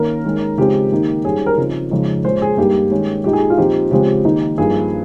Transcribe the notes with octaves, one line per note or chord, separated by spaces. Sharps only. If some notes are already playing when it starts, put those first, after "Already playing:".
Already playing: D#3 A#3 C#4 A#4
D#3 G#3 C#4
C#3 F3 G#3 C4 D#4 G4
D#3 A#3 D#4
G#2 G3 C#4 G#4
A#4
C#3 F3 C4 D#4
F2 C#3 G#3 D#4
A#2 G#3 C#4 C5
G#4
G2 G3 A#3 D#4 G4
D#3 G#3 C#4
A#2 G#3 D#4 G4
G#4
F4
A#2 F3 C4 D#4 G4
C#3 F3 G#3 C4 G4
D#3 A#3 D#4
G2 F3 A#3 D#4 G#4